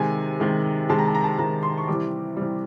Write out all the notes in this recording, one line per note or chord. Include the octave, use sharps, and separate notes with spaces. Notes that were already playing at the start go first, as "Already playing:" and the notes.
Already playing: C3 D#3 G#3 G#5
C3 D#3 G#3
C3 D#3 G#3 A5
A#5
A5
A#5
A5
C3 D#3 G#3 A#5
C6
C#6
C3 E3 G3 D6
C3 E3 G3